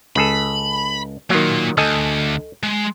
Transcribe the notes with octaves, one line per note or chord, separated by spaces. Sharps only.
C#2 G#4 A4 B5
D#3 F#3 A#3 F4
D2 A4 D#5 G#5
G#3